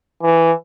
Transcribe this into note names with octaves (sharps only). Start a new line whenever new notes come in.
E3